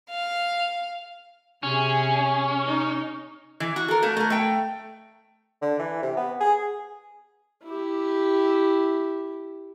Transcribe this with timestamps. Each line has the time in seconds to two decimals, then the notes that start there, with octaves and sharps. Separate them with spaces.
0.10 F5
1.63 C3 C#4 G#4
2.65 D#4
3.60 E3
3.76 F#4
3.88 A4 A#4
4.02 A3 A#3 F#4
4.17 A3 A#4
4.30 A3 G5
5.62 D3
5.79 E3
6.03 C3
6.17 B3
6.40 G#4
7.65 E4 G4